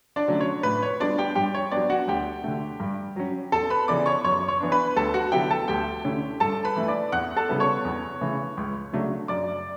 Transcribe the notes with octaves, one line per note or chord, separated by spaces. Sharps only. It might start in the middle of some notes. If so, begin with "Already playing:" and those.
D4 D5
D3 F#3 A3 C#4
C#5
A2 B4
C#5
G3 B3 D4 D5
G4 G5
G2 G4 G5
C#5
F#3 B3 D4 D5
F#4 F#5
D2 G4 G5
D3 A3
G2
F#3 C#4
E2 A4 A5
B4 B5
C#3 E3 B3 D5 D6
C#5 C#6
F#2 C#5 C#6
C#5 C#6
E3 B3 D4
B4 B5
D2 A4 A5
F#4 F#5
D3 F#3 B3 E4 G4 G5
A4 A5
D2 G4 G5
D3 A3 C#4 E4
G2 A4 A5
B4 B5
E3 A3 E4
D5 D6
E2 F#5 F#6
A4 A5
C#3 G3 B3 E4
C#5 C#6
E2
C#3 E3 A3
C#2
C#3 F#3 A3 D4
F#2 D5 D6